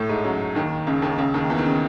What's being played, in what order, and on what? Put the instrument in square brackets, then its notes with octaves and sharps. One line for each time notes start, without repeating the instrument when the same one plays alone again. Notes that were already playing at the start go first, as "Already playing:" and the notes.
Already playing: [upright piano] A2 A3
G#2 G#3
F#2 F#3
D#2 D#3
C#2 C#3
D#2 D#3
C#2 C#3
D#2 D#3
E2 E3
D#3
C#3